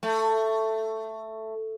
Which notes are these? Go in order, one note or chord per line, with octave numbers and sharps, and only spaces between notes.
A3